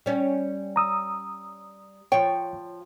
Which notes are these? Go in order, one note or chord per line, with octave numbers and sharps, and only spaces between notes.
G3 C#4
A#5 D#6 E6
F3 C#5 G5